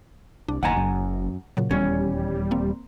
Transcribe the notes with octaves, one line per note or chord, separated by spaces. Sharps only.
C2 D4
F#1 D#2 F#5 G#5 A#5
F#2
A#2 C#3 F#3
D#1 E2 G3 C#4
A#3 C4